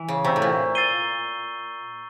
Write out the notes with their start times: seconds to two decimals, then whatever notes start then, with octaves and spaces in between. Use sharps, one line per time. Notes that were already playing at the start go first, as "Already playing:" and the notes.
Already playing: E3
0.08 C#3
0.24 C3 A#5 C#6 E6 G6
0.36 A2
0.42 A#2
0.75 E6 A6 C7 D#7 G7